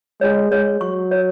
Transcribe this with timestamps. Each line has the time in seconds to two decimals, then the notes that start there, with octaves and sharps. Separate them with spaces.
0.21 G#3 C#5
0.51 G#3 C#5
0.81 F#3 C#6
1.11 C#5